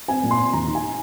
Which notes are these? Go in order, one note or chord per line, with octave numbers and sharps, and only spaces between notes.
C4 G#5
A#2
C6
C4
D#2 A#5
D#4
G#5